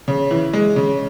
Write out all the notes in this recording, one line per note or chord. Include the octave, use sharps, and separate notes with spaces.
C#3
E3
G#3
C#3